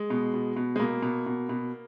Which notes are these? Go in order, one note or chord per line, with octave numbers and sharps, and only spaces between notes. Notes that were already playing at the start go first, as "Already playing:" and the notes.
Already playing: G#3
B2
B2
B2
G#3
B2 A#3
B2
B2
B2